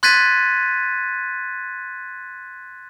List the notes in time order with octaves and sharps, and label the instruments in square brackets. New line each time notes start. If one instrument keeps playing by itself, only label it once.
[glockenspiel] C6 F#6 G#6 A6 B6 D#7